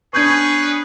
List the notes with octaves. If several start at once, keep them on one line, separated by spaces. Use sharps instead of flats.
B3 C#4 D4 G#4 B4 C#6 G6 G#6